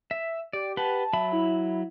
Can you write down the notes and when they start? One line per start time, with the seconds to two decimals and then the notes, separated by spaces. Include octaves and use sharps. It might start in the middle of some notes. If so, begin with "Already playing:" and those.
0.11 E5
0.53 G4 D5
0.77 G4 B4 F#5 A5
1.13 F#3 E5 B5
1.33 E4